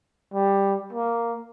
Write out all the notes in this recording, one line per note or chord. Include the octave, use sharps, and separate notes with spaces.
G3
A#3